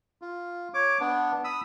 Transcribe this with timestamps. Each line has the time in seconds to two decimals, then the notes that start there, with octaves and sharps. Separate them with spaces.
0.22 F4
0.74 C#5 D6
1.00 B3 D4
1.44 B5 D#6 E6